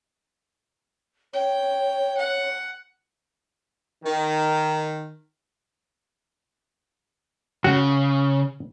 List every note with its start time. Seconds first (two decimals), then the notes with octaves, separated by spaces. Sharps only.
1.33 C#5 G5
2.17 F#5
4.04 D#3
7.64 C#3 F#4